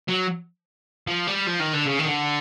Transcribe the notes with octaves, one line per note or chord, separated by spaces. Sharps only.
F#3
F3
G3
F3
D#3
D3
C#3
D#3
D3